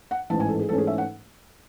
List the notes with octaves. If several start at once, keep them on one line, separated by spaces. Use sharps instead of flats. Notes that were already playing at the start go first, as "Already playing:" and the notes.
F#5
A1 G#2 E3 A5
G#5
A4
G#4
G#2 E3 A3 C#4 A4
G#4
E5
F#5